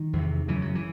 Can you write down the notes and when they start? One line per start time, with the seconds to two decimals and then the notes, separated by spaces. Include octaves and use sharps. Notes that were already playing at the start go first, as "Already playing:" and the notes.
Already playing: D#3
0.13 E2
0.18 C3
0.48 F#2 C#3 E3
0.62 F#3
0.75 E3